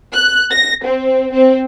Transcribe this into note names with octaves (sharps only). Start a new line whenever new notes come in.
F#6
A#6
C4
C4